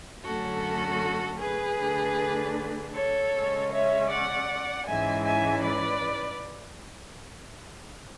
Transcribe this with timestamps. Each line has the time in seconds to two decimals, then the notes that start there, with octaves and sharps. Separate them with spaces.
0.24 F#2 D3 A3 C#4 F#4 A4
1.40 G#4 B4
1.78 D3 A3 D4
2.94 A4 C#5
3.32 C#3 G#3 C#4
3.71 C#5 E5
4.10 D5 F#5
4.87 G#2 E3 G#3 C#4 E4 E5 G#5
5.25 E5 G#5
5.64 B4 D5